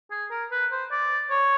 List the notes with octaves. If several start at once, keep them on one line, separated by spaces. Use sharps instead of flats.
G#4
A#4
B4
C5
D5
C#5